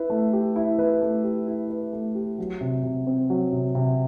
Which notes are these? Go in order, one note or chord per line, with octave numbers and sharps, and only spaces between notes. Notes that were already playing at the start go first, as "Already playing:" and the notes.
Already playing: E4 B4
A3
G4
E4
B4
A3
G4
E4
B4
A3
G4
F#3
C3
C3
C4
F#3
C3
C3